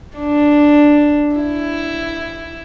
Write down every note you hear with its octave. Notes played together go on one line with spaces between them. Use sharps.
D4
E4